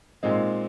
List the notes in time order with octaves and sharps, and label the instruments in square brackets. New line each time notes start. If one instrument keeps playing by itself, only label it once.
[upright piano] A#2 G#3 C4 D#4